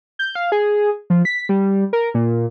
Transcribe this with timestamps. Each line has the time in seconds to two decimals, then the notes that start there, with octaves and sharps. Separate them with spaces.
0.19 G6
0.35 F5
0.52 G#4
1.10 F3
1.25 B6
1.49 G3
1.93 A#4
2.14 A#2